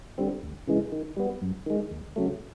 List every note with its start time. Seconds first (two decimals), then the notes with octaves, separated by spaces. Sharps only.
0.18 D3 G3 C4
0.43 D2
0.67 C#3 E3 G#3
0.92 D#3
1.17 G3 B3
1.42 F#2
1.66 D#3 G#3
1.91 D#2
2.16 C#3 F#3 A3